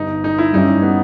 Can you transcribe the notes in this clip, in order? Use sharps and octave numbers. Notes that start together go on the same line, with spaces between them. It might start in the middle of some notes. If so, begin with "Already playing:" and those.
Already playing: G1 G2 G3 B3 D#4
D#4
E4
G2 G3 C#4 D#4 E4 G4
B3